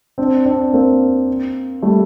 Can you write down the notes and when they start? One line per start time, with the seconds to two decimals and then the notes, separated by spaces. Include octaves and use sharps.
0.18 C4 D4
0.45 C4 D4
0.73 A#3 C4
1.82 G3 A3